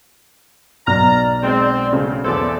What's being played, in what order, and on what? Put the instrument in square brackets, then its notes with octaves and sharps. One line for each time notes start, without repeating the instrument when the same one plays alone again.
[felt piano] B1 [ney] D5 [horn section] A#5 [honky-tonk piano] F6
[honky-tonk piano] G#3 C5 [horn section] C4
[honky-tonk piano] C#3 A3
[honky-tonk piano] E2 B3 C5 [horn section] C#3 A4 D5 [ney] E5